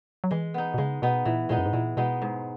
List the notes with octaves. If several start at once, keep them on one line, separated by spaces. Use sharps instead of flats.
F#3
E3 G#3
B3 D#4
B2
C#3 G#3
B2 B3 D#4
A#2 E3
A#2 G#3 B3 D#4
F#2
G#2
A#2 E3
B2 G#3 B3 D#4
G#2